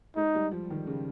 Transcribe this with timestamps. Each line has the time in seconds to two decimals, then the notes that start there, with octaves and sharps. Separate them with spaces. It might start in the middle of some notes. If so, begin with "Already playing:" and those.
0.16 G#3 D#4
0.35 G3
0.52 F3
0.70 D#3
0.87 C#3